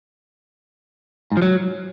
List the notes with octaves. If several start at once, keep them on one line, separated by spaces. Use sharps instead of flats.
G#2
F3
F#3